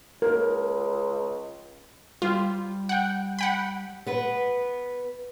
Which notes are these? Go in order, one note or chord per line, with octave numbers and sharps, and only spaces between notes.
C#2 A#4
G3 F4
F#5 G5
F#5 G5 B5
B3 B4